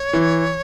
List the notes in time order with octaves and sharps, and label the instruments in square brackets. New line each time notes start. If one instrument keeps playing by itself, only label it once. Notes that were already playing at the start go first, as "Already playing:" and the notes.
Already playing: [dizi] C#5
[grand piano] E3